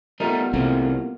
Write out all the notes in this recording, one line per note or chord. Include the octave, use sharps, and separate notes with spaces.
G3 A3 B3 D#4 F4 A#4
C2 C3 A3 A#3